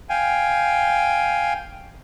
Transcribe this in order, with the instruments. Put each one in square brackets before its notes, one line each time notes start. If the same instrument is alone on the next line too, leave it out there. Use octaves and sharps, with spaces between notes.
[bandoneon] F5 G5 G#5